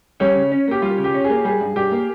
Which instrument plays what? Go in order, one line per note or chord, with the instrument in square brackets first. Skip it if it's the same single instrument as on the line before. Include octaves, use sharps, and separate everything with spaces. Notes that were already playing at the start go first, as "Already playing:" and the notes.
[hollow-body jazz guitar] G3 [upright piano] C#4
[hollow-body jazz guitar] C#3
C#4
[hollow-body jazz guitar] A#3 [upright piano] G4
[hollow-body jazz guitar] G3 [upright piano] F4
[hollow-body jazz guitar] C#3
[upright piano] G4
[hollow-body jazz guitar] C#4
[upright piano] G#4
[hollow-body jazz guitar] A#3
[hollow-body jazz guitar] G3 [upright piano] G#4
[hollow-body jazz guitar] G2
[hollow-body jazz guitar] G2 [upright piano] G4
[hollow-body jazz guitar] A#3